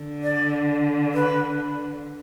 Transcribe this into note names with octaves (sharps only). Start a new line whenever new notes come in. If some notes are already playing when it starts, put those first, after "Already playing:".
Already playing: D3
D5
B4